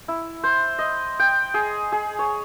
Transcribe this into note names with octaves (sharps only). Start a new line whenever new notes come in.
E4
C5
D#5
G5
G#4
G#4
C#5